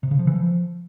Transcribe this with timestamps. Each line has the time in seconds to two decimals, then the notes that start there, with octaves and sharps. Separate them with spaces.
0.03 C3
0.11 C#3
0.19 F3
0.27 E3
0.35 F3